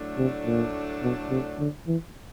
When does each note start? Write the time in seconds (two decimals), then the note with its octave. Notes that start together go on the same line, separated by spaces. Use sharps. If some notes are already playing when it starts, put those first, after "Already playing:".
Already playing: A2 F#3 A3 D4
0.18 C3
0.45 A#2
1.02 B2
1.30 C3
1.59 D3
1.87 E3